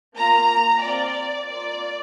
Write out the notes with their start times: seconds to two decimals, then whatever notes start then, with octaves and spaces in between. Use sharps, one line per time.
0.15 A#3 F4 A#5
0.83 C4 F4 D5
1.50 A#3 F4 D5